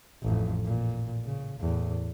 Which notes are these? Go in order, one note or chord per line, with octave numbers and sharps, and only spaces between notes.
A1 F2
A#2
C#3
E2 A2